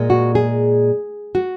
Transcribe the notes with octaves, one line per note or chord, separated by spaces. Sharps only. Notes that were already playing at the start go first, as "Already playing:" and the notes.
Already playing: A#2 G#3
F#4
G#4
F#4